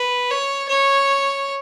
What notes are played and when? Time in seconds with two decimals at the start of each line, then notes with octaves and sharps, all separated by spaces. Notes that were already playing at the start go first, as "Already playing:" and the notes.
Already playing: B4
0.31 C#5
0.69 C#5